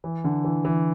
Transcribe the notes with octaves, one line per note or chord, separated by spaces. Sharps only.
E3
D3
E3
E3